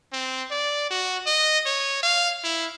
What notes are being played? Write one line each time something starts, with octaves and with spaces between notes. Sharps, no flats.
C4
D5
F#4
D#5
C#5
F5
E4